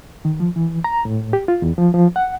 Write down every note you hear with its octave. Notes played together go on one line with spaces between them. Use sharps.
D#3
F3
E3
A#5
A2
G4
F4
E2
F3
F3
F#5